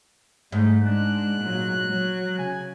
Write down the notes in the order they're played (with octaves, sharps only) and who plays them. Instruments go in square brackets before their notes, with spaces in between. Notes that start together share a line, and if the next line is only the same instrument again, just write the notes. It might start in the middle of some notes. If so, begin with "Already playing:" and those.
[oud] G#2 [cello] A3
[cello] G#3 D4 [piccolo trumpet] F#6
[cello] A#2 F#3
F#3
[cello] C#3 [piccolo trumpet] G#5